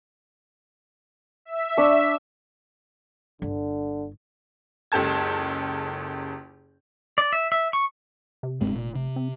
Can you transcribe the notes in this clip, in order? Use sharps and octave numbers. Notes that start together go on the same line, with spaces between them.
E5
D4 C#6
G1 D3
F#1 C#2 G4 A4 A5 G#6
D5
E5
E5
C#6
C3
F1 G2 G#3 C4
A#2
C3
C4